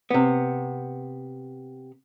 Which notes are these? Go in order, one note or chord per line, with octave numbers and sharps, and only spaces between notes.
C3 B3